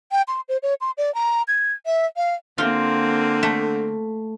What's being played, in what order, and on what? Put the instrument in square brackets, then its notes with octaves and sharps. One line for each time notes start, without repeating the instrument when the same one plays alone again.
[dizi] G5
C6
C5
C#5
C6
D5
A#5
G#6
E5
F5
[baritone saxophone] D3 [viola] A#3 C4 [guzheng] F4
[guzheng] A3